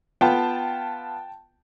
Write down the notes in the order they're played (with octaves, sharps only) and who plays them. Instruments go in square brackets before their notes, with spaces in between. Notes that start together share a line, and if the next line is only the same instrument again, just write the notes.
[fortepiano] B3 F4 F5 [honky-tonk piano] G5 A5